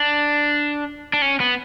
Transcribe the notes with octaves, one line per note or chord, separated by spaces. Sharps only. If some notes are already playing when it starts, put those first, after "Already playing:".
Already playing: D4
D4
C#4
B3